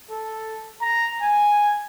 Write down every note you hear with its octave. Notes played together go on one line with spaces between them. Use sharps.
A4
A#5
G#5